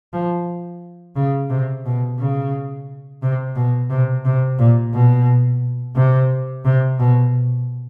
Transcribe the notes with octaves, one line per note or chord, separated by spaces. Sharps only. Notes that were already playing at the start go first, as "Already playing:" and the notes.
F3
C#3
C3
B2
C#3
C3
B2
C3
C3
A#2
B2
C3
C3
B2